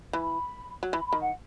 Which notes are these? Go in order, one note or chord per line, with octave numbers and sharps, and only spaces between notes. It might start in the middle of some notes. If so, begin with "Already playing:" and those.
E3 B5
F#3
E3 B5
B5
D#3
F#5